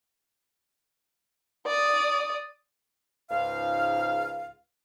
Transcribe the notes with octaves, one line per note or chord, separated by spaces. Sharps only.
D5 D#6
C#2 G#2 F5